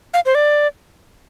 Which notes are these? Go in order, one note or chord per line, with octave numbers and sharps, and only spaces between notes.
F5
C5
D5